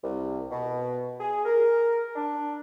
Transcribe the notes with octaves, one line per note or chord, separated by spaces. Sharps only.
C2
B2
G#4
A#4
D4